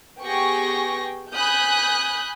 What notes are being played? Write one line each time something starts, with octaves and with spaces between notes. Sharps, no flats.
B3 G4 G#4 G5 C#6 A#6
G#5 B5 D#6 F#6 G6